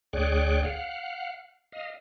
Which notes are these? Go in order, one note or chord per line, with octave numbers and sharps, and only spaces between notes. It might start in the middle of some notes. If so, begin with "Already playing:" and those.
D2 G#4 C#5 D5 G5 F#6
F5 F#5
D#5 F5